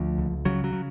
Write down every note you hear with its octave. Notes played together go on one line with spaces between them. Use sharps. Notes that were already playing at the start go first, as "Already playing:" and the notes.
Already playing: D2 F3
C#2
C#3 F#3
F#3
C#3